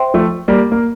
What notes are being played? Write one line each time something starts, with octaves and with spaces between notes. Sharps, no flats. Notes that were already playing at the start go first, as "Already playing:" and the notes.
Already playing: C5 E5 G5 C6
F3 A3
G3 A#3
A#3